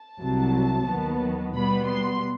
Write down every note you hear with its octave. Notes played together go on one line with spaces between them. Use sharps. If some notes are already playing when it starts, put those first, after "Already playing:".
Already playing: A5
C2 C3 F#3
D#2 D#3 F#3 B3
B2 G3 B3 B5
C6